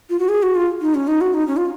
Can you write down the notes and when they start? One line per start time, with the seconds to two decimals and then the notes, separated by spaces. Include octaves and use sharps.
0.10 F4
0.19 F#4
0.29 G#4
0.43 F#4
0.56 F4
0.81 D#4
0.95 C#4
1.08 D#4
1.21 F#4
1.34 D#4
1.48 C#4
1.57 F4